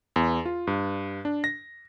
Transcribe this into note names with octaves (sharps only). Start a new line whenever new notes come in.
E2
F4
G2
D4
A#6